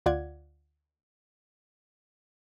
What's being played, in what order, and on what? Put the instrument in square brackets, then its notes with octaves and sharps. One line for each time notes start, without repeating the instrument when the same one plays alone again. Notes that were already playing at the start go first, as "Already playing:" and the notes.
[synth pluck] D2 F4 D5 F#5 G#6